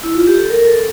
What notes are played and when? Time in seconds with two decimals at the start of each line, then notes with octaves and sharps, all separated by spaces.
0.03 E4
0.15 F4
0.27 G4
0.38 A4
0.50 A#4
0.67 A4